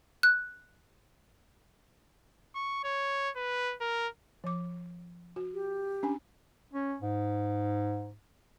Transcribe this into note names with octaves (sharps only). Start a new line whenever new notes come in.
F#6
C#6
C#5
B4
A#4
F3 D6
F#4
G4
C#4 D4 G#5
C#4
G#2